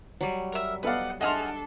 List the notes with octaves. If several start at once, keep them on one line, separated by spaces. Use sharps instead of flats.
F#3 G3
A#4 E5
B3 A4 B4 D5 D#5 F5 F#5
D4 F#4 G#4 A4 D#5 E5 C6 F6